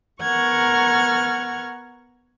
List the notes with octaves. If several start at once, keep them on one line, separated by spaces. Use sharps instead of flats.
B3 A#4 F#5 C#6 F6 G#6